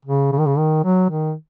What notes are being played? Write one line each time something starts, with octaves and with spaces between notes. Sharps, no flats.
C#3
C#3
D#3
C#3
D#3
F#3
D#3